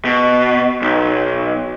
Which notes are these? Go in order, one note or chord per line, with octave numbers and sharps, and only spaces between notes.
B2
B1